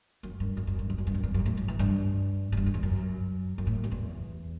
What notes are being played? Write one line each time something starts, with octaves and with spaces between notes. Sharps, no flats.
F#2
G2
F#2
F#2
G2
E2
F#2
G2
F#2
E2
F#2
A2
F#3
E3
G2
A2
G2
F#2
E2
F#2
F#2
A2
F#2
E2